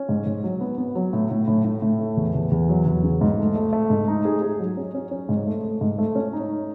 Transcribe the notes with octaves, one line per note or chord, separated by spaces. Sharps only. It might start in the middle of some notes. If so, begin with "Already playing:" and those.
Already playing: C#4
G#2
G#2
F#3
B3
B3
F#3
A2
A2
A2
A2
A2
A3
E2
E2
E2
F#3
E2
C#3
G#2
A3
A3
A3
G#2
D#4
G#4
G#4
F#3
C#4
C#4
C#4
G#2
A3
A3
G#2
A3
C#4
D#4